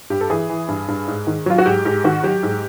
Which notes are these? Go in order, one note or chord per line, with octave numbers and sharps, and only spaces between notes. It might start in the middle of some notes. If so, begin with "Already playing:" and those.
G2 G4
A4
E3 G#4
E3
G2
G2
G#2
D#3
F#3 F4
F#4
G#2 G4
G#2 G4
D#3 F#4
F#3 G4
G#2